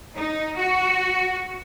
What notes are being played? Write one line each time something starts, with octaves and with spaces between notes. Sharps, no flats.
D#4
F#4